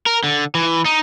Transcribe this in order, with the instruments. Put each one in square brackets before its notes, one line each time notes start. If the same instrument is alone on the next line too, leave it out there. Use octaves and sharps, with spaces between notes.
[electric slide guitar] A#4
D3
E3
D#4